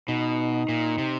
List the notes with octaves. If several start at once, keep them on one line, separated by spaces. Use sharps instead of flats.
B2 D#4
A#2
C3